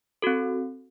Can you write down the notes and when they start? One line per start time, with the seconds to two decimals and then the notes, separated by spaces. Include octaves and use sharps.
0.22 C4 F#4 A4